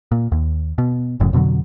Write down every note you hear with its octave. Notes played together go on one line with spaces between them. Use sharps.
A#2
D#2
B2
F#1 F#2 A2 C#3
F2 B2 D3 F#3